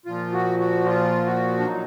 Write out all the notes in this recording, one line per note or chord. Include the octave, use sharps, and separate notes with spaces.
A#2 F3 F4
F#4
F#4
F4
F#4
D4
A#2 F#3 D#4